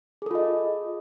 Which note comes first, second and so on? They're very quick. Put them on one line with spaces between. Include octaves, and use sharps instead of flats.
G#4 A4 F4 D#5